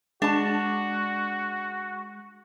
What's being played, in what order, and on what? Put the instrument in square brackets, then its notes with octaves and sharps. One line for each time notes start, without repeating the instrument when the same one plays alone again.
[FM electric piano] G#3 [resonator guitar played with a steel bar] D4 A5 [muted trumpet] F#4